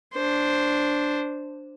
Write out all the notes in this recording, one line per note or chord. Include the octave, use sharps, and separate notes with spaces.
D4 C5